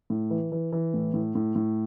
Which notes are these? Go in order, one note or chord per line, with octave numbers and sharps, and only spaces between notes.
A2
E3
E3
E3
A2
A2
A2
A2